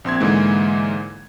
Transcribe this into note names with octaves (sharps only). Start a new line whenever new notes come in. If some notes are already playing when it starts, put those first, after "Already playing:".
A#1 C4 C6 G#6
G#2 D3 E3 G#3 A#3